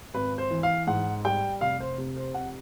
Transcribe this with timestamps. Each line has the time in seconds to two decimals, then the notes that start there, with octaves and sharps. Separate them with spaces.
0.14 G#1 B4
0.38 C5
0.51 E3
0.63 F5
0.87 G#2 F#5
1.25 G3 G5
1.61 F1 F5
1.80 C5
1.98 C3
2.16 C5
2.34 F2 F#5